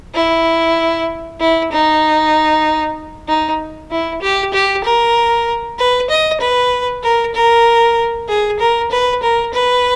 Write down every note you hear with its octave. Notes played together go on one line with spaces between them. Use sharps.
E4
E4
D#4
D#4
E4
G4
G4
A#4
B4
D#5
B4
A#4
A#4
G#4
A#4
B4
A#4
B4